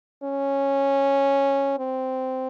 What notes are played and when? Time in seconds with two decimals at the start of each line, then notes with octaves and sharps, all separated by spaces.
0.23 C#4
1.79 C4